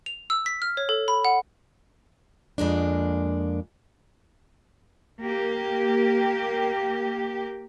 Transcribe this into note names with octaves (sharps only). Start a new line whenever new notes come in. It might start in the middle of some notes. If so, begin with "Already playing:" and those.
F7
E6
B6
F6
C#5
A4
B5
F#5
F2 G#3 A#3 D4
A#3 G4